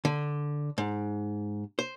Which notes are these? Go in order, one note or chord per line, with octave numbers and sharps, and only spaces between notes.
D3
G#2
C5